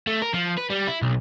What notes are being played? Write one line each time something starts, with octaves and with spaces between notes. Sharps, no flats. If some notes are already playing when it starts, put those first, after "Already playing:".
A3
A#4
F3
B4
G3
E4
B1